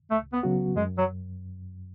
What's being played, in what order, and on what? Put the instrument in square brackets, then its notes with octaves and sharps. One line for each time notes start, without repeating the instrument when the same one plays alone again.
[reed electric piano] C#2 [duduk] A3
[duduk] B3
[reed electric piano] C#3 F#3 B3 F#4
[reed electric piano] F#2 [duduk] G#3
[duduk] F#3